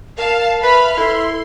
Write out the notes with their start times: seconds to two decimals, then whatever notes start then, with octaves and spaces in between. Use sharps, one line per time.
0.18 A#4 F5 A5
0.63 B4 E5 B5 F6
0.97 E4 A4 C6